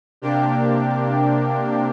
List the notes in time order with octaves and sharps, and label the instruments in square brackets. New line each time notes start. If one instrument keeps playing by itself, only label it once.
[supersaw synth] C3 A#3 D4 G4